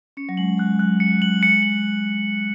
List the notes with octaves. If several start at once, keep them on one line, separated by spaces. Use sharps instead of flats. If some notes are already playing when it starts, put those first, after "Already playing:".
C#4 C#7
F#3
G#3 F#7
G#3 F#6
F#3 F#6
C#7
F#3
F#7
G#3 C#7
F#7